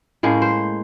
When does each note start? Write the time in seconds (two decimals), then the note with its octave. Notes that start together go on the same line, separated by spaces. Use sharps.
0.23 A2 G#3 A#3 C#4
0.42 C5